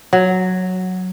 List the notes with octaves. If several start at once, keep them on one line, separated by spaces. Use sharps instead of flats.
F#3